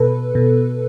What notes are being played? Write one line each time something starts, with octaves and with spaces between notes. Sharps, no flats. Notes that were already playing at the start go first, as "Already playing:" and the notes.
Already playing: B2 A4 B4
B2